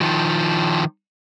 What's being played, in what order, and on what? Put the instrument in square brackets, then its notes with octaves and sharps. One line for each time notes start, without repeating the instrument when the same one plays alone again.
[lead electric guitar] D#3 F3